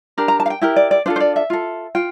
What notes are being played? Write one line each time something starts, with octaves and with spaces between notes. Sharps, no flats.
D4 G4 A#4
A#5
A5
F5
G5
E4 G4 A#4 E5
D5
D5
D4 F4 A4 C5
C5
D5
E5
F4 A4
F4 G5